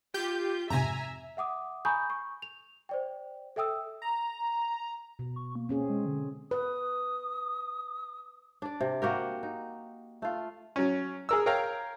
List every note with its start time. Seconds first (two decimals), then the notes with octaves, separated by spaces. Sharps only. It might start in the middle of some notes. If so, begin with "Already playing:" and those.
0.14 F4 G4 G6
0.70 F2 G#2 C3 E5 G#5 A#5
1.37 E5 F#5 D6 D#6
1.85 G#5 A#5 B5 C#6 D#6 G6
2.10 C#6
2.42 F7
2.89 C5 D5 G5
3.56 A4 E5 G5 D#6 E6
4.02 A#5
5.19 B2
5.36 C#6
5.55 A#3
5.69 C4 C#4 G#4
5.89 G#3
6.06 D3
6.51 B4 D#6
8.62 D4 D5
8.81 C3
9.02 A#3 F#4 G4 A#4
9.43 D#4
10.22 A3 F4
10.76 F#3 C#4
11.29 G#4 A#4 E6
11.46 A#4 C#5 F5 G5 A#5